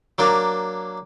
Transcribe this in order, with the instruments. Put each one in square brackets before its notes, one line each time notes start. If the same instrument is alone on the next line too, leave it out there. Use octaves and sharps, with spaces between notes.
[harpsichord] F#3 A#3 D4